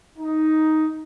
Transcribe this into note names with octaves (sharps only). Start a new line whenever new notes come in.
D#4